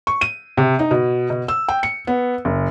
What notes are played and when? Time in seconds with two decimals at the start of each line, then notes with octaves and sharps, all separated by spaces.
0.07 C#6
0.21 D#7
0.57 C3
0.79 D#4
0.91 B2
1.30 B2
1.48 E6
1.68 G5
1.83 C#7
2.07 B3
2.45 F#1